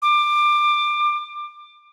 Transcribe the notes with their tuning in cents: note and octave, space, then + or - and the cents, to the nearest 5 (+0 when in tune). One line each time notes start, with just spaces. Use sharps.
D6 +20